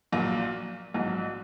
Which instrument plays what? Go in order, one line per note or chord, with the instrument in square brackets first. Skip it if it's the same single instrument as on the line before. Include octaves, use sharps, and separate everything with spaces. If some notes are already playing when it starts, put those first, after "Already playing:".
[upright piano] A#1 A#2 F#3 A#3
A#1 G#2 F#3